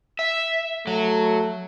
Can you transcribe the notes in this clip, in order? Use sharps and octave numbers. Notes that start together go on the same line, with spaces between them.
E5
F#3 A3